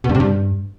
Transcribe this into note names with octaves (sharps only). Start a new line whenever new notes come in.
B2
G2
C3
G2